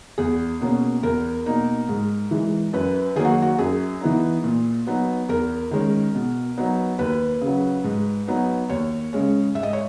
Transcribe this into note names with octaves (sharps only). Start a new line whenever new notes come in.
E2 G#4
B2 A#3 C#4
E2 A#4
B2 A#3 D#4
G#2
E3 G#3
F#2 B4
D#3 F#3 A#3 G#4
F#4
F#4
F#2 G#4
E3 B3 D#4
A#2
F#3 B3 D#4
E2 A#4
D#3 G#3 C#4
B2
F#3 B3 D#4
D#2 B4
C#3 F#3
G#2
F#3 B3 D#4
D#2 C#5
C#3 G#3 C#4
G#2 E5
D#5
C#5